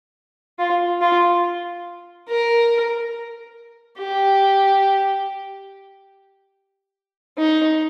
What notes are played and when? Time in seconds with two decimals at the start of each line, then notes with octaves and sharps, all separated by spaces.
0.59 F4
1.01 F4
2.29 A#4
3.98 G4
7.38 D#4